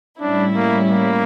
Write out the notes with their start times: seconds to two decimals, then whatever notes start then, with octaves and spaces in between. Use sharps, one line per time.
0.20 A2 G3 C#4 D4 E4
0.56 A#3
0.90 A#3